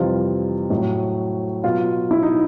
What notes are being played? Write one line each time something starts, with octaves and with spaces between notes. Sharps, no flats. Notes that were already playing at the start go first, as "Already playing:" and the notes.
Already playing: F2 C3 E3 G3 F4
A2 F#3
B2 F#3 F4
E4
D#4